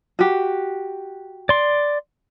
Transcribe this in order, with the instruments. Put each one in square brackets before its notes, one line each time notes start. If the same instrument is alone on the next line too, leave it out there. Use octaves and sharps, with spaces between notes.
[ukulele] F#4 G4
[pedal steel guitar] D5 C6